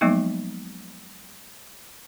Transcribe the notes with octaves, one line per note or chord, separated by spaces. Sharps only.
F3 F#3 G#3 A#3 B3 D#4